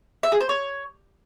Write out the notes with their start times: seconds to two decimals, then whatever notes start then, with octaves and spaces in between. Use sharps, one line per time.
0.23 E5
0.32 G#4
0.40 C5
0.49 C#5